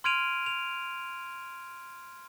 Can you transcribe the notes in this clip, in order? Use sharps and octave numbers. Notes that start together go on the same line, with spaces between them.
C6 F6 G#6 D7 D#7 F7
F7